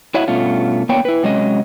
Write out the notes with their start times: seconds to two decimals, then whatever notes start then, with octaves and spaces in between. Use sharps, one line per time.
0.14 E4 F#4 C#5 D#5 E5 F#5
0.28 G2 B2 A3 C#4 F4
0.89 A#3 B3 D4 A#4 C#5 G5
1.05 E4 B4
1.23 C3 F#3 G#3 C#4 D#5